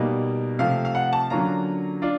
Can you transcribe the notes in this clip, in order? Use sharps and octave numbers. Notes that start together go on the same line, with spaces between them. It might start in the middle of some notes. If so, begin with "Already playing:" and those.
Already playing: B2 G3 A#3 D#4
C3 F3 A3 F5
F5
F#5
A5
D3 F#3 A#3 C#4 F4 A#5
D4 F4